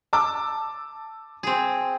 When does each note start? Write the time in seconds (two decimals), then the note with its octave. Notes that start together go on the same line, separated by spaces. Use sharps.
0.13 A5 D6 E6
1.43 C4 G#4